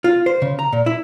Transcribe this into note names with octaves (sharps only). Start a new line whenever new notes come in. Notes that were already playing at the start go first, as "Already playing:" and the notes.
F4
C5
C#3
A#5
A#2
E4